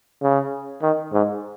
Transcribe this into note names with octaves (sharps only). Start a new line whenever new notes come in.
C#3
D#3
G#2